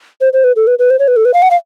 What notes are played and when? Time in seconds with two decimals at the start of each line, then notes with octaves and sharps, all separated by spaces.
0.21 C5
0.33 C5
0.44 B4
0.56 A4
0.67 B4
0.79 B4
0.90 C5
0.99 C#5
1.08 B4
1.16 A4
1.25 B4
1.34 F5
1.42 F#5
1.51 F5